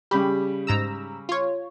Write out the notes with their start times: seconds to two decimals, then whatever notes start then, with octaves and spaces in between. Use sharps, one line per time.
0.11 C#3 G3 G4 B5
0.67 G#2 A#5 E6
1.29 F4 C#5